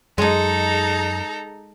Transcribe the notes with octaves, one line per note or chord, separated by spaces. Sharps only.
F#2 G#3 D#4 G#4 A4 A#5